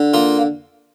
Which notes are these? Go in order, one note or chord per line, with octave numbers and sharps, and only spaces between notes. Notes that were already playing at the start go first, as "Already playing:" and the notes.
Already playing: D3
A#3 F4